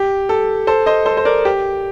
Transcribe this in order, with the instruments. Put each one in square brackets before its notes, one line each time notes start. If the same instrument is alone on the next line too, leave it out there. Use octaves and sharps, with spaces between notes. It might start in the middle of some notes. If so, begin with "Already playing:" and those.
Already playing: [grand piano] G4
A4
A4 C5
C5 D#5
A4 C5
C5
A#4 D5
G4